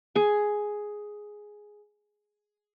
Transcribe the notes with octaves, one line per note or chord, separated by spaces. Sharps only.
G#4 G#5